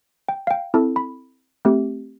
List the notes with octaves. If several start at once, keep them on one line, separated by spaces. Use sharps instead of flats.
G5
F5
G5
C4 E4 A4 A5
B5
A3 C4 G4